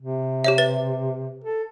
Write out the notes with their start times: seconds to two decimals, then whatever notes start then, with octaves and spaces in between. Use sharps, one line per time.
0.02 C3
0.44 G4 C#5 E5
0.58 B4 A6
1.44 A4